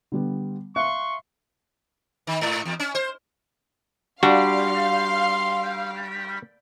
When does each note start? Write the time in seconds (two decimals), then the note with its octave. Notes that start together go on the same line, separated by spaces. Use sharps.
0.12 D3 G3 B3
0.76 E5 F5 C6 C#6 F#6
2.27 D#3
2.41 G#2
2.65 E2
2.80 C#4
2.95 C5
4.23 G3 D4 F#4 F5 C6